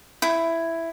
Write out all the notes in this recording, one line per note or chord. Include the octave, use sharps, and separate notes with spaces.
E4